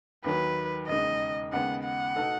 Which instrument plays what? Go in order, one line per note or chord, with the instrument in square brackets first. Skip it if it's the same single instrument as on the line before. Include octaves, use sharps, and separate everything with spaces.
[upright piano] D#2 D#3 F#3 [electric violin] B4
[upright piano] E1 D#2 C#3 G#3 D#4 [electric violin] D#5
[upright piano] D#2 C#3 G#3 B3 D#4 [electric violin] F#5
[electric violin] F#5
[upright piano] B2 A3 D#4 A4